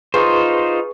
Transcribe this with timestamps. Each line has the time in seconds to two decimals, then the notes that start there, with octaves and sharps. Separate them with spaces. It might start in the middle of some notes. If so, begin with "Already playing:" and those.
0.14 D#4 F4 G#4 B4 C5 C#6